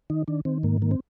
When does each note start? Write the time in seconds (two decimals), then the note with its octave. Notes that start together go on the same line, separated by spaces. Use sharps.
0.10 D#3 D#4
0.28 D#3 D4
0.45 D#3 C4
0.63 G#2 A#3
0.82 D#3 A#3
0.91 C4